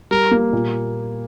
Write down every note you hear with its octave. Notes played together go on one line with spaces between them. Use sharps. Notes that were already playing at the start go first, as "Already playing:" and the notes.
G3 A#4
A#3
A#2